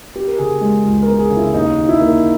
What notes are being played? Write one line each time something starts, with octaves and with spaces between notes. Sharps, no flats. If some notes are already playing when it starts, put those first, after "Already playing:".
B3 G4
A#4
C#3 G#4
G#3
C#2
A#4
B3
G#4
C#3
E4
D#2 D#4
D#3
E4
A#3